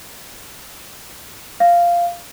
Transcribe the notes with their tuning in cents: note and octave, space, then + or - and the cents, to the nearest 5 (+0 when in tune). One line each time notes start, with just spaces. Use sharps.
F5 -10